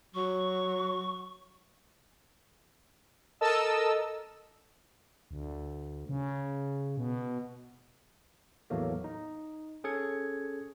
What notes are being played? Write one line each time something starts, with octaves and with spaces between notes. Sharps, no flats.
F#3 C#6
A4 A#4 D#5 A5 E6
D2
C#3
B2
E2 A2 E3 F#3 A3 A#3
D#4
C#4 G#4 A4 G#6 C#7